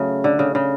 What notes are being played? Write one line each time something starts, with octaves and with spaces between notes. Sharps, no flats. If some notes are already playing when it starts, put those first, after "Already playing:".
Already playing: C#3 F#3 A3
D3
C#3
C#3